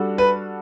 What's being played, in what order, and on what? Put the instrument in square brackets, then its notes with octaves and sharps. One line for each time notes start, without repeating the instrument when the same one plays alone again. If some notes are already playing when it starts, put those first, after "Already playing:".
Already playing: [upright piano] G3 D4 F#4 A4
[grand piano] B4